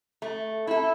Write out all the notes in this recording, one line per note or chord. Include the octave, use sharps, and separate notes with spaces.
A3
E4 A4